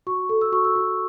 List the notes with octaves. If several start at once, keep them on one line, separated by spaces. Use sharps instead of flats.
F#4 C#6
A4
E6
F#4 C#6
E6
F#4